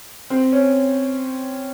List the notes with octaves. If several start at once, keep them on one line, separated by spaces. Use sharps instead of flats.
C4
C#4